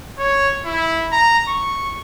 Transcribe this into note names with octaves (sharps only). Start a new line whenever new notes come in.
C#5
E4
A#5
C#6